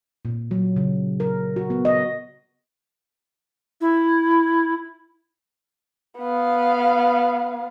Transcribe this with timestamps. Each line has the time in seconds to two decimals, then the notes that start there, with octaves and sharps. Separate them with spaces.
0.25 A#2
0.51 F#3
0.76 C#3
1.20 A#4
1.56 F#4
1.70 B3
1.85 D#5
3.81 E4
6.20 B3 F5